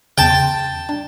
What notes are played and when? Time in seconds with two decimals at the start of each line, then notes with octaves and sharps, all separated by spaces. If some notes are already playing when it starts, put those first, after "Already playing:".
0.18 E2 C#3 G5 A5
0.30 C6
0.89 D4